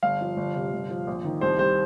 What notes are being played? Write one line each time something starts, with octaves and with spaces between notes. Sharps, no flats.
G1 F5
F3
G1
C3
G1
F3
A#1
D#3
C2 C5
G3 C5